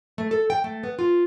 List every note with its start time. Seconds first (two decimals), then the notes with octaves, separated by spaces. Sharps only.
0.18 A3
0.31 A4
0.50 G5
0.64 A3
0.83 B3
0.99 F4